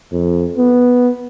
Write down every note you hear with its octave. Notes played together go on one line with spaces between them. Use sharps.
F2
B3